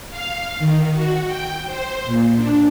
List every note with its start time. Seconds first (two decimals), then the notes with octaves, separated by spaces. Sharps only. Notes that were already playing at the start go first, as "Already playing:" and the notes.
0.10 F5
0.59 D#3
0.93 F#4
1.27 G5
1.67 C5
2.06 A#2
2.37 D4